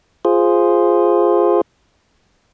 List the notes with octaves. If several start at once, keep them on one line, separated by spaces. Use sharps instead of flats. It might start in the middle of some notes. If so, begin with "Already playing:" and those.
F4 G#4 C5